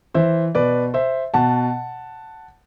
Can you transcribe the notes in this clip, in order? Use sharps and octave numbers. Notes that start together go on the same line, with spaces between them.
E3 C5 E5
B2 B4 D5
C5 E5
B2 F#5 A5